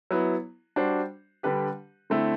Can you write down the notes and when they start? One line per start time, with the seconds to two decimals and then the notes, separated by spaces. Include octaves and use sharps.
0.11 F#3 B3 E4
0.76 G3 D4 F#4 C5
1.43 D3 G3 D4 G4 B4
2.10 D3 A3 C4 E4